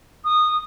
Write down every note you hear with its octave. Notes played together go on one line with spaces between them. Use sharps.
D#6